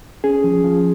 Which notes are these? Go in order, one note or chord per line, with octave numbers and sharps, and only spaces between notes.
C#4 G#4
F3
F3